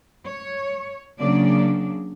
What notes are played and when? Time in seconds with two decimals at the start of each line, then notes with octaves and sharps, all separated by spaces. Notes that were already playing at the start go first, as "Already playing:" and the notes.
0.26 C#5
1.19 C#3 F#3 A#3 D4 D5